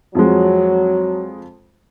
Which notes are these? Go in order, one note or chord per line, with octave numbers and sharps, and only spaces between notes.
F2 F3 F#3 G#3